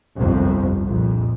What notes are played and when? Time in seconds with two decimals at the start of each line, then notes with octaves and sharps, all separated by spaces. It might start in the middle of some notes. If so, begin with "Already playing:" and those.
0.18 G1 C2 F2
0.85 A#1 F2